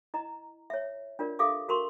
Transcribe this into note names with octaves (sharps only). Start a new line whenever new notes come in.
E4 D#5 A#5
C#5 E5
D4 F4 A#4 D5
G4 A4 E5 F5 D6 D#6
F#4 A#4 C6 C#6